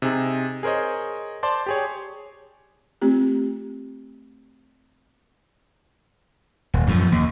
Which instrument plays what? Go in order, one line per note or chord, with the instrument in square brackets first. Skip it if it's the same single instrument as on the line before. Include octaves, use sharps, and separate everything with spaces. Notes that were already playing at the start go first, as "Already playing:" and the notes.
[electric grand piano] C3 D#4 G#4
G#4 A#4 C5 C#5 D#5
C5 D5 A5 C6
G4 G#4 C#5
[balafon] A3 C4 F4 G4
[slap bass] D#1
F#2 A2 C3 F3
D#2